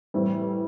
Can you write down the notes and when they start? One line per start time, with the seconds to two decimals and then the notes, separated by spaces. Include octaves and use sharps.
0.14 A2 E3 G3 C4 E4